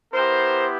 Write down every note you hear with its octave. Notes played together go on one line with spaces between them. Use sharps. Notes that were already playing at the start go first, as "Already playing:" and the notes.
B3 E4 G4 A#4 C5